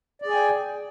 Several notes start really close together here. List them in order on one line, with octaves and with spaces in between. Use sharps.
D5 G#4 G#5 G5